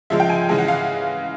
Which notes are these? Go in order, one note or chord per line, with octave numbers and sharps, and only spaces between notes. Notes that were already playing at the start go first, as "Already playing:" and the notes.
C#3 F3 G#3 E5
G5
G#5
C#3 E3 G#3 G#5
F#5
F5